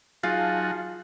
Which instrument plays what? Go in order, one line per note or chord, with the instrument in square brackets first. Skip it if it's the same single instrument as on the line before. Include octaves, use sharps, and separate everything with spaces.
[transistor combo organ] F#3 D#4 F#4 [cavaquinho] F4 [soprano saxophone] G#4 [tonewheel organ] F5 A5